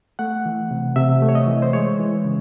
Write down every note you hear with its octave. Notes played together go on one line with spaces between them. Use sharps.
A3 F#5
E3
C3
C3 E5
A3
C#5
D#5
E3
C5
G#3 C#5
E3
C#3